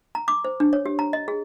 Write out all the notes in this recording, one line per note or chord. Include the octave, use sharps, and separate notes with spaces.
A#5
D6
C5
D4
C#5
G4
A#5
D#5
G#4